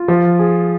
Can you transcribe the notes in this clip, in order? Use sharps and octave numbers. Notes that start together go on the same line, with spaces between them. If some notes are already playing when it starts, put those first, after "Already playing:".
Already playing: F4
F3
G#4